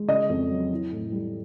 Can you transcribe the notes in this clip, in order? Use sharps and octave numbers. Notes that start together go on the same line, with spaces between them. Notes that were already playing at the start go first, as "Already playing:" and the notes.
Already playing: G#3
C#3 D#5
F2
F#3
E3
A2
G3